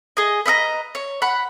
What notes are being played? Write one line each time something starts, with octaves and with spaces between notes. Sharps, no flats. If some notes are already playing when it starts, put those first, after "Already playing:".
G#4 D#5
B4 D#5 E5 A#5
C#5
F#5 B5